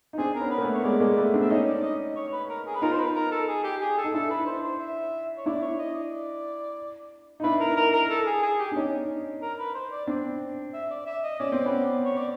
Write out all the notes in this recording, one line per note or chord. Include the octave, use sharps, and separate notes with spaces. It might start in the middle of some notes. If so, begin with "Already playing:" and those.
D#4
C4 D4 G#4
A#4
B3 C#4
B4
A#3
A3 B3
C#5
G#3 A#3 D5
G#3 A#3
A3 B3
C4 D4
E5
C#4 D#4 D#5
D5
D#5
C#5
B4
A#4
G#4
B4
D#4 F4 A#4
C5
B4
A#4
A4
G#4
G4
G#4
A4
D#4
D4 E4 A4
B4
C5
C5
E5
C#5
D4 E4 D5
C#5
D#5
D5
D#4
D4 E4 B4
A#4
A#4
A#4
A4
G#4
G#4
G4
D4
C#4 D#4
A#4
B4
C5
D5
C4 D4
E5
D5
E5
D#5
C#4 D5
C4
B3 C#4
C#5
D5